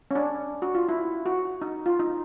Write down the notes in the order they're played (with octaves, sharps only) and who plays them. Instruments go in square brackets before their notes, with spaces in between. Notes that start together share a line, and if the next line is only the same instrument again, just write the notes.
[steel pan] C#4
D4
F#4
F4
E4
F#4
D#4
F4
D#4